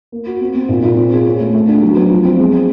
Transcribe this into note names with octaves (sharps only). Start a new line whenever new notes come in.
A#3
F#4
C4
C4
A#2
A#2
C4
G#4
C#4
A3
A3
D4
F#3
B3
F3
C4
G#3
C4